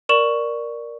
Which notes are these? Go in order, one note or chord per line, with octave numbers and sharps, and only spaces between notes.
A#4 D5 C#6 E7 F#7